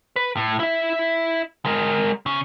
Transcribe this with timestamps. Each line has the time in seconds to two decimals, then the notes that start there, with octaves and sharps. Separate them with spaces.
0.16 B4
0.37 A2
0.60 E4 E5
1.65 G#3 A#4
2.26 C#3 C#4